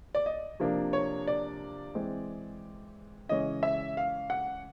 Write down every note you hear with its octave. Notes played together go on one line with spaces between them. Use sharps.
D5
D#5
C3 F3 A#3 D4
C#5
D5
E3 G#3 C4
C#3 E3 G#3 C#4 D#5
E5
F5
F#5